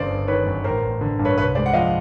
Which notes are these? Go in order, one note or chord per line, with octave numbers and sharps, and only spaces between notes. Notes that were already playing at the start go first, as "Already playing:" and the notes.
Already playing: G1 C#3 C5 D5
G1
D#3 B4 C#5
F#2
A1 A#4 C5
A1
D3
G2
B4 C#5
C2 B4 C#5
G#3 C5 D5
F#5
F3 D#5 F5